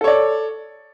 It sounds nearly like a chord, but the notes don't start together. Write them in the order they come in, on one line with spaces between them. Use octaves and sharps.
A4 C#5 D5